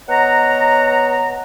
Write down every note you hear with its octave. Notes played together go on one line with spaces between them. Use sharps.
B3 C#5 D#5 F#5 A#5